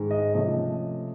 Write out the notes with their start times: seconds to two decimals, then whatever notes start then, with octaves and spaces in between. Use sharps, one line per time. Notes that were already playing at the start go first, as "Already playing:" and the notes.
Already playing: G#2 D#3 G#3
0.11 D#5
0.34 C3 F3 A3 C#4 F4 D#5